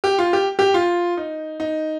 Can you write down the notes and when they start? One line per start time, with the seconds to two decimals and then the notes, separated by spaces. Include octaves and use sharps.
0.04 G4
0.19 F4
0.33 G4
0.59 G4
0.74 F4
1.17 D#4
1.60 D#4